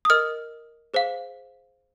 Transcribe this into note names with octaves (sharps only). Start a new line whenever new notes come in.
D#6
A#4 D#5 F6
G#4 C5 F5